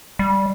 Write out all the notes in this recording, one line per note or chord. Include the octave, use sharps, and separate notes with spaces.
G3